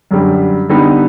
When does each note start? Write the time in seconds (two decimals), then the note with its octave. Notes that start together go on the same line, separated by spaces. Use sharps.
0.11 F#2 D3 G3
0.69 D3 G3 B3 D#4